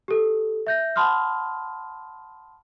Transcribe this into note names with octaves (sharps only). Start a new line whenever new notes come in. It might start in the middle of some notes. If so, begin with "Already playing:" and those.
G4 A4
E5 G6 A#6
F#5 A5 B5 C6 D#6 F6